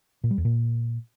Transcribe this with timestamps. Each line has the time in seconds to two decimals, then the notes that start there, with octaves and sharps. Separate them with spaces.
0.24 A#2
0.31 G3
0.38 E2
0.45 A#2